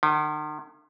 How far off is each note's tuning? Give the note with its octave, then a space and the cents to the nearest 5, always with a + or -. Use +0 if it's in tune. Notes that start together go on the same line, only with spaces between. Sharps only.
D#3 -45